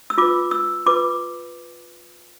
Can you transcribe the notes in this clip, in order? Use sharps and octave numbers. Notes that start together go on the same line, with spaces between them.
E6
F4 B4 D6
E6
F4 B4 D6